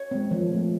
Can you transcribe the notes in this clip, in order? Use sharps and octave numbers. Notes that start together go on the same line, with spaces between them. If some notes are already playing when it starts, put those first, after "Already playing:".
Already playing: C#5
G#3 C4
F3
A3 C4